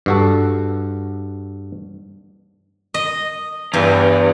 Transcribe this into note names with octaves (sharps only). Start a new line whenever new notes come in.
G2 F#4 A4
D#5
E2 G2